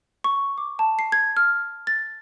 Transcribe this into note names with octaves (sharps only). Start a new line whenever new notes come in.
C#6
D6
A5
C7
G#6
F6
A6